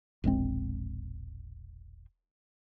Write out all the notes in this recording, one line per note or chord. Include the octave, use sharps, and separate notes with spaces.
E1 A#1 G#3 C4